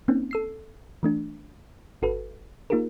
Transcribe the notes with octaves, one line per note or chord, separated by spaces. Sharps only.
A#3 C4 C#4 D#4
A4 E6 C7
E3 A3 D4
G1 F#4 A4 B4
A#3 D#4 F4 G4 G#4 A#4